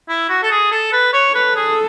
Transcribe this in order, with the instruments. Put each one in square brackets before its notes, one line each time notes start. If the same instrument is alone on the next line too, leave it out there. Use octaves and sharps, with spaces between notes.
[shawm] E4
F#4
A4
G#4
A4
B4
C#5
[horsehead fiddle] A4 [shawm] B4
[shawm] G#4